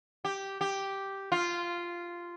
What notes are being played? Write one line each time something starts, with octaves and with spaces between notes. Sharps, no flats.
G4
G4
F4